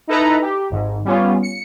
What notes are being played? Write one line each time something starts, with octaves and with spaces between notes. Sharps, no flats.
D#4 E4 A4 B4 A#5
G4
G#1 G#2
G3 B3 C#4 F4
C#7